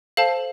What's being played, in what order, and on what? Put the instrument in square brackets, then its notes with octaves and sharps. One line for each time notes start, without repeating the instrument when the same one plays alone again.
[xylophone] A4 C5 F5 A5